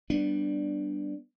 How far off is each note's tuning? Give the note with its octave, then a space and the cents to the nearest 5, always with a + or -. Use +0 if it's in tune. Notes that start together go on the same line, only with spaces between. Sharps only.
G3 +0 B3 +0 D4 +5